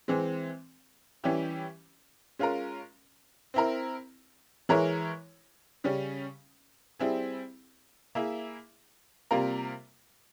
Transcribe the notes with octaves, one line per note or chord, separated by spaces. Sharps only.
E3 G#3 C4
E3 G3 C#4 E4 G4
G#3 C#4 F4 A#4
C4 E4 A#4
E3 G#3 E4 A#4 C#5
C#3 G3 C#4
G3 C4 E4 G#4
A#3 E4 G#4 E5
C3 G3 A#3 F4 A#4